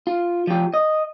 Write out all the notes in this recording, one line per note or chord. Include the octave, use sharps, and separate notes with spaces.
F4
F3 G4
D#5